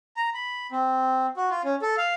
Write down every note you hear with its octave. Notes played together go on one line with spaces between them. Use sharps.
A#5
B5
C4
F#4
F4
C#4
A4
F5